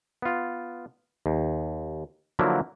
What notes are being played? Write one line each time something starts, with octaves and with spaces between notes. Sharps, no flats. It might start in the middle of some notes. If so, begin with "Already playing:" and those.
B3 F4
D#2
D3 F3 F#3 A#3 E4